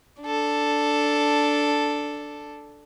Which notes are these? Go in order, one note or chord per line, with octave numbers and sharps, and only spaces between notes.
D4 A4